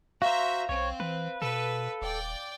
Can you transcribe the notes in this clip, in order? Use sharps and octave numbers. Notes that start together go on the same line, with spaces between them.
F#4 C5 E5 F5 A#5
B1 C4 C#5
E3 B4
B2 A4 B4
D#1 D5 G5